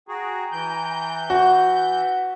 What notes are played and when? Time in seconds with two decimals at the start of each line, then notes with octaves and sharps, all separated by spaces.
0.08 F#4 G#4 G5 G#5 A#5
0.52 E3 G6
1.30 F#4 F#5
1.49 E5